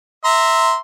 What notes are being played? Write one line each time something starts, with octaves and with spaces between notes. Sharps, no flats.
E5 A#5 C6